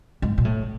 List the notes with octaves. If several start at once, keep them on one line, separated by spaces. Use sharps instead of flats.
G#2
A#2
A2